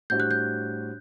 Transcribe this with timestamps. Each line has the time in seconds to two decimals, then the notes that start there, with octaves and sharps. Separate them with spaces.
0.10 A2 G3 D4 F#4 C5 G6
0.20 F#6
0.31 G6